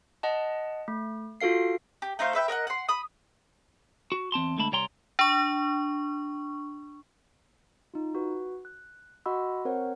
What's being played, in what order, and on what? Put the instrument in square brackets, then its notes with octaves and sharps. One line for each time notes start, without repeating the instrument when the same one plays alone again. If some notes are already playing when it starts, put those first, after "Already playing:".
[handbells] D#5 F#5 A5
A3
F4 F#4 A4 F5 C7
[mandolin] G4
A3 D#4 C5 F5
B4 E5 G5
A#4 D#5 F5 F#5
F#5 C6
B5 D#6
[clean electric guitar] F#4
E2 C4 A5 C6
D3 G#3 A3 A5 B5
C2 G3 C#5 G5 A#5 C6
[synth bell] D4 C#6
[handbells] D#4 F4
F#4 B4
F#6
F#4 D#5 F#5 B5 C6 E6
C4 A#4 C5 C#5 F#5